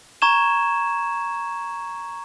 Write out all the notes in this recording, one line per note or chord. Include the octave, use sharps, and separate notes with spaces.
A#5 C#6 G#6 E7